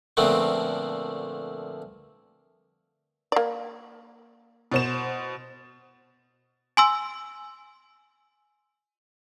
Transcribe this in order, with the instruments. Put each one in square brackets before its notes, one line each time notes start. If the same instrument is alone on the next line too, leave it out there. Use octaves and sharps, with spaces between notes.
[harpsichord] A#2 D3 F3 A3 B3 C4
[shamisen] A#3 D5
[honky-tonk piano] B2 C5 E7
[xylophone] G#5 C6 E6